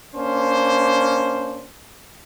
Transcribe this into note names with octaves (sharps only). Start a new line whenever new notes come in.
A#3 C#4 D4 C5